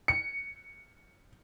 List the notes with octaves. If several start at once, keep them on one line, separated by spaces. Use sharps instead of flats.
C#7